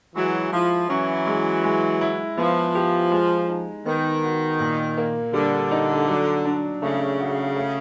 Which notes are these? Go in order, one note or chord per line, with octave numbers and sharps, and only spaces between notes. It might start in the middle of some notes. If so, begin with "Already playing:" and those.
E3 F#3 G#3
F3 E4
E3 F#3 C#4
G#3
G#3
E4
F3 B3
G4
G#3
D#4
D#3 B3
F#4
A#2
A#3
D3 G3
D#4
F#3
D4
C#3 A3
F#4
A3